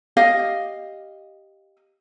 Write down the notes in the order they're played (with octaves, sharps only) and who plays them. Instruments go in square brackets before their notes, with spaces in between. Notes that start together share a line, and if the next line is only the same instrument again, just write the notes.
[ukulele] G4 D#5 F5